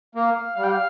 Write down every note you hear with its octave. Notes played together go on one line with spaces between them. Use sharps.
A#3 F5
G3 F5
G5
F5